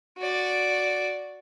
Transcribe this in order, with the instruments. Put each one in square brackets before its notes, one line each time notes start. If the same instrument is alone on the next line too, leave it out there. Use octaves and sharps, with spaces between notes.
[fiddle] F#4 D5